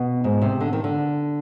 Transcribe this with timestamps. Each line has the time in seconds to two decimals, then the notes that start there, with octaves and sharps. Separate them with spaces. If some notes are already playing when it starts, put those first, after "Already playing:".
Already playing: B2
0.24 G#2
0.42 C3
0.61 D3
0.73 D#3
0.84 D3